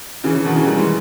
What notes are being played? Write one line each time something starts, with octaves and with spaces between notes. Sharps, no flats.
C#3 E3
C#3 E3
B2 D#3
C#3 E3
D#3 G3
E3 G#3